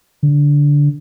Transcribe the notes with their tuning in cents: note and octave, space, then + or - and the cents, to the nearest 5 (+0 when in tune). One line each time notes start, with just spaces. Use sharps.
D3 -15